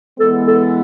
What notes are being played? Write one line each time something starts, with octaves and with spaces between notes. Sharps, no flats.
E3 G#3 B3 A4
A4